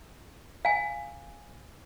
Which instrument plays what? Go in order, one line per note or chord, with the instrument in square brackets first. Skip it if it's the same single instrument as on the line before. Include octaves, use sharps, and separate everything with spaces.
[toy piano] F5 G#5